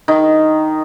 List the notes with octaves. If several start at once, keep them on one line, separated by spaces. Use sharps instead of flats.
D#3